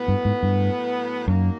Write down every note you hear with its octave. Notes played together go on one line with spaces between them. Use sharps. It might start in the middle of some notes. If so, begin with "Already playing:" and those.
Already playing: A2 F#3 B3
G2
G#2
G2
F#2 D#3 F#3 A#3